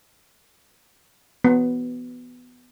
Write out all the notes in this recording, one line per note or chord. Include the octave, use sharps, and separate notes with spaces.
B3